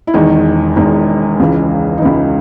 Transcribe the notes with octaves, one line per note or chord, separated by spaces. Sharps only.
E4
E1 E2 D#3 D#4
E1 E2 D#3
C#2 C#3 E3
D#4
C#2 C#3 E3 E4